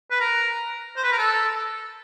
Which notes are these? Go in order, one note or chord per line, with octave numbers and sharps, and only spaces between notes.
B4
A#4
C5
B4
A#4
A4